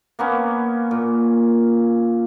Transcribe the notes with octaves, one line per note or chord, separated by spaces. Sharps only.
A#3 B3 C#4
A#2